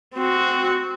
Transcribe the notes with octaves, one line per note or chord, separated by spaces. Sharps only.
C4 F#4